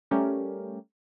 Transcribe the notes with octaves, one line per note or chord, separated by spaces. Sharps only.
G3 A3 C#4 G4 A#4